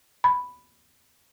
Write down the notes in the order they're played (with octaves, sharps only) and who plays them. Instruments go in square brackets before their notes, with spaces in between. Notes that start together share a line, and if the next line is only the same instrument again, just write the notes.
[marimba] B5